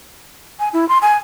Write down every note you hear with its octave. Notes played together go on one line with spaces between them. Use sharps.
G#5
E4
C6
G#5